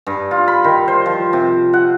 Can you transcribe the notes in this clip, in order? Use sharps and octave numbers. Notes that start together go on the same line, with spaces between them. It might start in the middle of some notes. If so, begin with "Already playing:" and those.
G2
F4
B5
D#3
C5
F3
C3
F#5